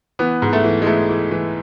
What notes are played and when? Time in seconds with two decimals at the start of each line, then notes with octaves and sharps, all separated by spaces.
0.19 E3 B3
0.42 G#2
0.53 A3
0.64 E3
0.82 G#3
0.87 E3 A3
1.09 E3
1.31 E3